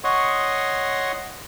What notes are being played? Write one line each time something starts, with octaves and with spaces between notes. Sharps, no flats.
C#5 D#5 F#5 C6 C#6 D#6